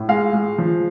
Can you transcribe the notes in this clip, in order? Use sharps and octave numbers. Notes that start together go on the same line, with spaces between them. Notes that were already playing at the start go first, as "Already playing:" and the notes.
Already playing: A2
G#3 F5
G#3
F3